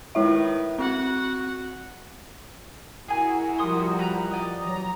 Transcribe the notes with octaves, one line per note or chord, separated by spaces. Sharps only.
D#3 G#3 E4 B4 E5
C4 F#4 F#5
E4 F#4 G#4 A#4 G#5
F3 G3 C6 D#6
B4 A#5
D5 D#5
E3 F#3 A#5